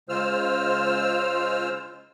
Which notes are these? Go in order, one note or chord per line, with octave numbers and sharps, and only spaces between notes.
C#3 G#3 F4 C5 E6 F6